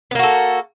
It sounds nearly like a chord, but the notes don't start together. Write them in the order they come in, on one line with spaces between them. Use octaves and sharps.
B3 A#3 F#4 A4